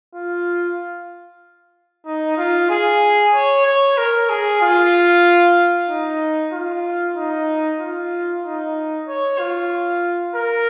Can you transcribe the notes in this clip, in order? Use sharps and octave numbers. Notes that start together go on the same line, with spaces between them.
F4
D#4
F4
G#4
C#5
C#5
A#4
G#4
F4
D#4
F4
D#4
F4
D#4
C#5
F4
A#4